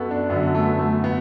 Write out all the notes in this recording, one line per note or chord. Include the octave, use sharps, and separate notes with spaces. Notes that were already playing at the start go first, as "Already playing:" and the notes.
Already playing: F#2 B3 F#4 A4
D4
F#2 D3 F#3 B3
A3
A3
B3